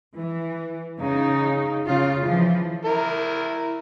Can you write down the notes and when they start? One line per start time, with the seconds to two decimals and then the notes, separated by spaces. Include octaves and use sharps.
0.15 E3
0.99 C#3 D#4
1.86 C#3 F4
2.27 E3 F3
2.85 E4 A#4